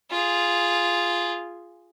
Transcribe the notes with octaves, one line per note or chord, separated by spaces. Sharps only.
F4 G#4